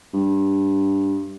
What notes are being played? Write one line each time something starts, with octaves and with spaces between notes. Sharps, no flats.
G2